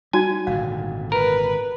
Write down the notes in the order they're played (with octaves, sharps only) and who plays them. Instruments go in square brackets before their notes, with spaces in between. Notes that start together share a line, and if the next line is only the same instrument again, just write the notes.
[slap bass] G3 [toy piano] D#4 F#4 A5 [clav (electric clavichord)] G#5
[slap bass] G#1 A#2 D3 [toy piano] F5
[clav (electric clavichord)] A#4 [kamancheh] B4